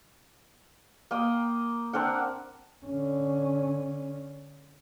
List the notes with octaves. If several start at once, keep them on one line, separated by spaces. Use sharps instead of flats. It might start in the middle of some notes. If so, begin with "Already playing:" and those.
A#3 G5 D#6
C4 D4 A#4 F#5
D3 C#4